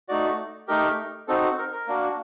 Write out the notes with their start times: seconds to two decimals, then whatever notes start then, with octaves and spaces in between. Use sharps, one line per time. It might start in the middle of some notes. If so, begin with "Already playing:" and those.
0.09 A3 D#4 F#4 D5
0.68 A3 D#4 G4 A#4
1.28 C4 D#4 F#4 A4
1.58 A#4
1.72 A#4
1.87 A#3 D4 F#4